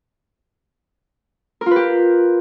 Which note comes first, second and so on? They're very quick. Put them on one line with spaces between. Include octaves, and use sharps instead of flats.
A#4 F4 B4 G4